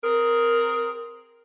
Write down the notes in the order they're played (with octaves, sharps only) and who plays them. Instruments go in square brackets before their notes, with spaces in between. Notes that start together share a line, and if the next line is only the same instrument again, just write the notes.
[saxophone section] C4 G#4 A#4